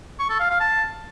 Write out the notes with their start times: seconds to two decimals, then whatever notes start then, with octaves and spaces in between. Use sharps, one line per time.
0.19 C#6
0.30 A4
0.40 F5
0.50 F5
0.60 A5